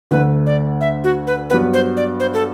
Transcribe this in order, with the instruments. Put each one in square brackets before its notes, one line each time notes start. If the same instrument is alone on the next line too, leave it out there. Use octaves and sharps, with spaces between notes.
[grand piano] D2 D3 A3 [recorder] B4
[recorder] D5
E5
F#4
B4
[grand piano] G2 F#3 B3 [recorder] B4
[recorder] C5
D5
C5
A4